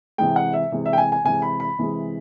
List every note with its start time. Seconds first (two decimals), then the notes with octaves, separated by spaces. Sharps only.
0.18 C3 E3 G#3 G5
0.36 F#5
0.54 E5
0.72 C3 E3 G#3
0.86 E5
0.93 G5
0.98 G#5
1.12 G#5
1.24 C3 E3 G#3 G#5
1.42 B5
1.60 B5
1.79 C3 E3 G#3